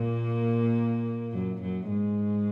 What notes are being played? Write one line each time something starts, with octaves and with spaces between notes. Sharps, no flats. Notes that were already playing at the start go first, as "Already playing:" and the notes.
Already playing: A#2 A#3
F#2 F#3
F#2 F#3
G#2 G#3